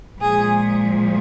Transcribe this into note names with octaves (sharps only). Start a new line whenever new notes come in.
A#2 F3 G#3 G#4